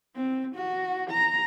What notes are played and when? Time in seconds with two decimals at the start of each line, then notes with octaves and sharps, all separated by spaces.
0.16 C4
0.56 F#4
1.11 A#5